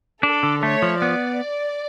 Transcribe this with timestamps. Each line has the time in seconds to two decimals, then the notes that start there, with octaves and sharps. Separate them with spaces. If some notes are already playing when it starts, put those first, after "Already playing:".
0.23 D4 A4
0.43 D3
0.62 A3 C#5
0.82 F3
1.01 B3 D5